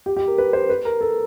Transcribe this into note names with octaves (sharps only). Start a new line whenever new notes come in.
G4
G4
A#4
B4
C5
B4
A#4
A4